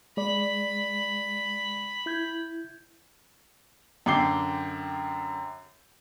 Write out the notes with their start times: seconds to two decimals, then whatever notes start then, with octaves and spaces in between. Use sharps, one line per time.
0.17 G#3 D5 B5
2.06 E4 G6 G#6
4.06 F#2 D3 G5 D6 C7 G7